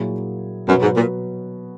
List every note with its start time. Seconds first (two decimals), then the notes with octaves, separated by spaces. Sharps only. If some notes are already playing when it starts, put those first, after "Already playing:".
Already playing: A#2 F#3 A#3 E4 G#4
0.68 F#2 B2 F#3 B3 F#4 B4
0.81 G#2
0.96 A#2